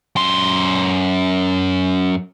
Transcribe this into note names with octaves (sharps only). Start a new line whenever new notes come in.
F#2 C6